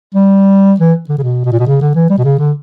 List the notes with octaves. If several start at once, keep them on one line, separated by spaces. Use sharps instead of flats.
G3
E3
D3
C#3
B2
B2
A#2
B2
C#3
D3
E3
G3
B2
C#3
D3